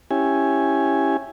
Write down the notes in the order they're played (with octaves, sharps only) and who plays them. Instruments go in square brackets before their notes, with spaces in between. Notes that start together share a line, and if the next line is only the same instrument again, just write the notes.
[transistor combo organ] C#4 E4 G4 G#5